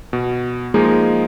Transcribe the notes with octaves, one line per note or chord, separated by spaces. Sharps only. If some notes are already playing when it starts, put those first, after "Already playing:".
B2
F3 G#3 A#3 D#4 G#4